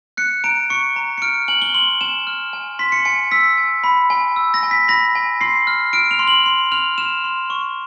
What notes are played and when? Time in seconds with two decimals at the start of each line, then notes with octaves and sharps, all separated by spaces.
0.17 F#6 C#7
0.44 A#5 D7
0.70 C#6 C#7
0.96 A#5
1.18 C#7
1.22 F6 D7
1.48 G#5 F#7
1.62 G7
1.74 C6 F#7
2.01 G#5 E7
2.27 F6
2.53 G#5
2.79 C6 B6
2.92 C#7
3.05 G#5 C#7
3.31 E6 B6
3.58 G#5
3.84 B5
4.10 G#5
4.36 E6
4.54 A#6
4.63 G#5
4.71 B6
4.88 B5 A#6
5.15 G#5
5.41 C6 C7
5.67 F6
5.93 F6 D7
6.11 F7
6.19 C6
6.28 F#7
6.46 C6
6.72 F6 F7
6.98 F6 E7
7.24 C6
7.50 C#6